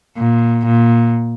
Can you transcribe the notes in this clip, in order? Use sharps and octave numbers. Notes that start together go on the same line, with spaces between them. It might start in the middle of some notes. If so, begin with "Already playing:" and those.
A#2
A#2